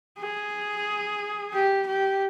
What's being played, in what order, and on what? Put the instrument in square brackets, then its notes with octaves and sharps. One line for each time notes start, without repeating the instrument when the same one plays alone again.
[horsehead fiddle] G#4
G4
G4